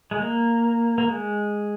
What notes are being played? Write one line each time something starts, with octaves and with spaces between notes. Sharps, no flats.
G#3
A#3
A#3
G#3